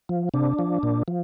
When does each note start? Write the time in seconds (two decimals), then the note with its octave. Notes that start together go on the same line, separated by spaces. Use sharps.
0.09 F3
0.34 C3 D4
0.59 F3
0.83 A#2
1.08 F3